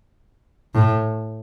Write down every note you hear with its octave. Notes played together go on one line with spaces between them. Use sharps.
A2